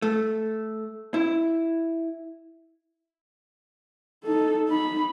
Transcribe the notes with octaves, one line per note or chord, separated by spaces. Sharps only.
A3
E4
D#4 A4
D#4 B5